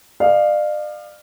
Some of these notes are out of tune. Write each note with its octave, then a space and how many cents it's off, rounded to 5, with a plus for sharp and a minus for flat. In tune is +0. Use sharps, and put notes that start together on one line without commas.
D5 +40 F5 +0